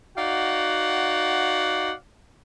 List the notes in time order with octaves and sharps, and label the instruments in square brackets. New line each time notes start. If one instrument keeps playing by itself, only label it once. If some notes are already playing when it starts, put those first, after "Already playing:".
[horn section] D#4 F#4 D5 F5 F#5